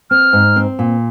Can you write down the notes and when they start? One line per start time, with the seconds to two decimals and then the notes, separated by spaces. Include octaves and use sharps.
0.10 C4 F6
0.33 G#2
0.56 C4
0.79 A#2